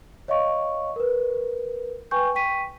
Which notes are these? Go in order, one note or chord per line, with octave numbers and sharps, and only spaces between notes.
C#5 D#5 F5 C#6
A#4 B4
B4 G5 G#5 C#6 G6
G5 C#6 B6 D#7